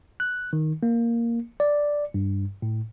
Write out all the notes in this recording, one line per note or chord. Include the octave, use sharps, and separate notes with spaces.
F#6
D#3
A#3
D5
G2
A2